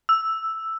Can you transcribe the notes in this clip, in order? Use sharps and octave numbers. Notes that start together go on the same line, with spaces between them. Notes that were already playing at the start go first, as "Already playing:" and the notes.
E6